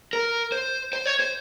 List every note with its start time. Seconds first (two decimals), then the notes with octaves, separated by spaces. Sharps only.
0.13 A#4
0.52 C5
0.93 C5
1.06 C#5
1.20 C5